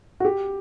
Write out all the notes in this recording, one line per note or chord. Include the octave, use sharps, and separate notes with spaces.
F#4
G4